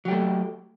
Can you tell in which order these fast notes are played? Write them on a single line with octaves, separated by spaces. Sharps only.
F#3 G4 A3